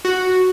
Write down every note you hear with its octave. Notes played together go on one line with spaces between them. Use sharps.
F#4